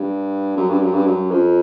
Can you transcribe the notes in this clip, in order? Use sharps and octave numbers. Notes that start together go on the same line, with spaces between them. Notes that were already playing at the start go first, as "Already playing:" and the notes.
Already playing: G2
F#2
G2
F#2
G2
F#2
F2